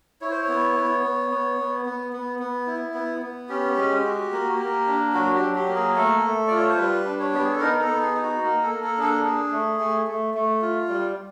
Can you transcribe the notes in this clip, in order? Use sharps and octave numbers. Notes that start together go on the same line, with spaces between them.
E4 C#5
C5
C#5
B3
B3
B3
B3
B3
B3
B3
B3
E4
B3
B3
C#4 G4
G#3
F#4
A#3
A#3
D4
F#3 F#4
G4
F#3
G4
A#3
G#4
A3 A4
A3
F4 D5
C#5
C5
G3 B4
D4
C#5
B3 G4
G#4
A4
D#4 A#4
A#4
A4
B3
G#4
D#4
F#4
A#3
A4
A#3
A4
D4 G#4
A4
D4 G#4
A3
A3
A3
A3
F4
G3